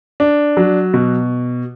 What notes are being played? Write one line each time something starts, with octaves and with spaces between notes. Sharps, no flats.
D4
F#3
B2